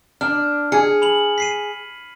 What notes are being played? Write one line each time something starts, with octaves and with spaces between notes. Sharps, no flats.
D4 F6
G#4 G#6 C#7
B5 F7 F#7
B6 C7 D#7